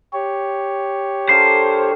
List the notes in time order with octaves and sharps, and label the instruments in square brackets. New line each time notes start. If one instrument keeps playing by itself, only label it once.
[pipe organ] G4 C#5
[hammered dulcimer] D3 F4 A#4 [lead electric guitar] C5